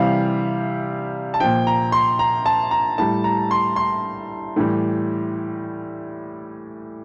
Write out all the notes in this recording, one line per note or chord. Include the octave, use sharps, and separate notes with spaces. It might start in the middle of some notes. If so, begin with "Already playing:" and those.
Already playing: C3 E3 G3 F5
A5
A#2 F3 G5
A#5
C6
A#5
A5
A#5
A2 G3 A5
A#5
C6
C6
A2 E3 G3